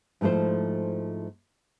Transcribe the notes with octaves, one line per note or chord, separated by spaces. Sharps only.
G#2 F3 A3 E4 C5